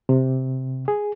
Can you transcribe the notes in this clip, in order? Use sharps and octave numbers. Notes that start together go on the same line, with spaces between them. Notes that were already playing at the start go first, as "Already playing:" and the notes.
C3
G#4